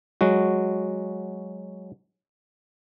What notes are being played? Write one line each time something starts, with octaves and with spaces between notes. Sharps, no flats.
F#3 G#3 F#4